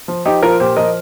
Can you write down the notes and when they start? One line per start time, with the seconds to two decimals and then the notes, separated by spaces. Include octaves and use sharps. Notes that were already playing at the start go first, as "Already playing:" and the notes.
0.08 F3
0.25 F3 D#4 G4
0.43 F3 F4 A#4
0.60 A#2 G4 C5
0.76 F3 A#4 D#5